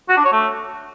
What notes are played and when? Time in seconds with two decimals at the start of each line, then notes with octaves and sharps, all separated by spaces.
0.09 F#4
0.17 D4
0.25 C#5
0.32 A3